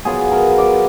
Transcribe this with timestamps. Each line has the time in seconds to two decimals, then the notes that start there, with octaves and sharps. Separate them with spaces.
0.05 F#3 B3 F4 G#4
0.31 A#4
0.58 D5